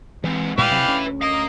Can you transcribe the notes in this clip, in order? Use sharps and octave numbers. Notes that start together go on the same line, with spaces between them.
G#2 C3 E3
G2 A#2 G#3 E4 G4 B4 D5 F5
C3 F#3
D2 C#4
D#5 F5 A#5